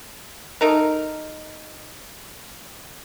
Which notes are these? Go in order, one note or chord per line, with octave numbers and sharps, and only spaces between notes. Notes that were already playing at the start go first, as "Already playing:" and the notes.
A3 D#4 A#4